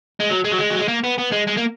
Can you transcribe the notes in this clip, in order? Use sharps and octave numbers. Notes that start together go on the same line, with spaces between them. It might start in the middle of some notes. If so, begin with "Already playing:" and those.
G#3
F#3
G#3
F#3
G#3
F#3
G#3
A#3
B3
B3
G#3
G#3
A#3